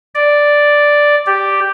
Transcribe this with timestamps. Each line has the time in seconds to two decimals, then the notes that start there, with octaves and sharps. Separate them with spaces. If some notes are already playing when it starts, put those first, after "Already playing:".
0.15 D5
1.26 G4